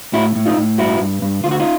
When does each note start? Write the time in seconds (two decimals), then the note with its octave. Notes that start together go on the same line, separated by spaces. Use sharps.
0.13 A2 E4 F#4
0.36 A2
0.46 D#4 F4
0.57 A2
0.78 G2 E4 F#4
1.01 G2
1.22 G2
1.44 D2 F4
1.51 F#4
1.60 D#4 F4